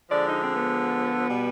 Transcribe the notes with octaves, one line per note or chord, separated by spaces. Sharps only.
D3 F3 G#3 D5
D#4
C4
B3
B2 G3